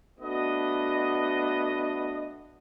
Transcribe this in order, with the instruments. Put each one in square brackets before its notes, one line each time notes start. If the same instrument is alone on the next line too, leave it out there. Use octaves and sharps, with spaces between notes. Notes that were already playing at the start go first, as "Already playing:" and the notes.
[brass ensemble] A3 B3 D4 F#4 D#5